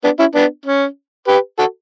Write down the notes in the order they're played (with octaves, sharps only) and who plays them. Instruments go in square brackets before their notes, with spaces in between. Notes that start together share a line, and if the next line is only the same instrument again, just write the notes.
[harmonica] B3 D4
C#4 E4
B3 D4
C#4
G4 B4
F#4 A4